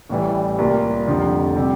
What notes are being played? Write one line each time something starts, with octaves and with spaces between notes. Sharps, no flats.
A1 A2 E3 G3
C2 C3 G3 A#3 F4
F1 F2 D3 F3
C3 G3 C4 G4